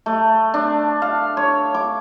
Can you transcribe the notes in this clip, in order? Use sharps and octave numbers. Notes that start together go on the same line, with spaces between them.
A3
D4
F5
C#5
D6